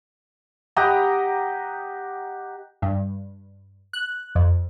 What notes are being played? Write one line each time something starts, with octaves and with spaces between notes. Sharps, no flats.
G4 D#5 F#5 A#5
G2
F#6
F2